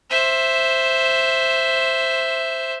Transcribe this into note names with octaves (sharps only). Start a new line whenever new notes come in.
C5 E5